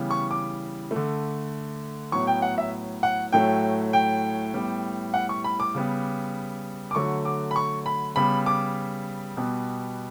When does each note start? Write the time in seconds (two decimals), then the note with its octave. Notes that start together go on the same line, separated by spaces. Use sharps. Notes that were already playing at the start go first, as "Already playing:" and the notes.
Already playing: C#3 E3 G3 B3
0.11 C#6
0.31 D6
0.91 A3
0.96 D3
2.12 A2 F#3 B3 C#6
2.27 G5
2.42 F#5
2.58 E5
3.03 F#5
3.32 A2 F#3 A3 G5
3.93 G5
4.54 A2 G3 B3
5.14 F#5
5.29 C#6
5.44 B5
5.60 D6
5.74 C#3 G3 B3
6.91 D6
6.95 D3 F#3 A3 C#6
7.25 D6
7.51 B5
7.56 C#6
7.86 B5
8.16 C#3 G3 B3 B5
8.46 D6
9.37 B2 G3 B3